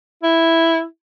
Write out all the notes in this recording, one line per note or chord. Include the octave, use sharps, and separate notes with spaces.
E4